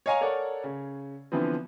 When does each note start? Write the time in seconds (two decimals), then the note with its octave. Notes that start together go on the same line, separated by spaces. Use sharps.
0.06 C#5 D#5 F5 G#5 A#5
0.21 A4 A#4 C#5 D5 F#5
0.64 C#3
1.32 D3 E3 F3 B3 C4